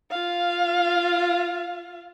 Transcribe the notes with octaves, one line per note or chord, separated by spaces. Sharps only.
F4 F5